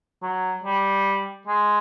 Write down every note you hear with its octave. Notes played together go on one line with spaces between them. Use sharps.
F#3
G3
G#3